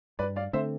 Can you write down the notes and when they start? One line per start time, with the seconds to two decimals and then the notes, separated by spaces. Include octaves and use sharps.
0.19 G2 B4 D5
0.36 D5 F5
0.53 D3 A3 C4 C5 E5